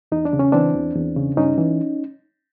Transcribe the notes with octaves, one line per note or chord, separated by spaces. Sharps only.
E2 D#4
D4
C#3
C#4
E3 C4 D4
E2
E2
C#3
G2 C#4 D#4
E3